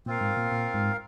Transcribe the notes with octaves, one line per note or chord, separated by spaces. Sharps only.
A#2 C4 F4 A#4 F5
G#2
A#2
A#2
G#2